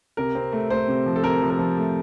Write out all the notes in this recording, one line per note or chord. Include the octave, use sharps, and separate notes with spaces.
C3 A#4
C4
A3
A3 C5
C3
F3
A4
C3 A#4
F3
A#4
F3
A3